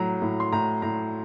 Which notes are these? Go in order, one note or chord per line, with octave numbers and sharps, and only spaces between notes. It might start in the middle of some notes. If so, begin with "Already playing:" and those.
Already playing: A2 F#3 A#5
A2
C6
A2 A#5
A2 A#5